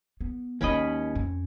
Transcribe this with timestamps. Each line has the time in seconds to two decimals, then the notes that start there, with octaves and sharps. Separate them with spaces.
0.21 B3
0.61 D#2 D#3 G#3 C#4 D#5 G5 B5
1.15 F2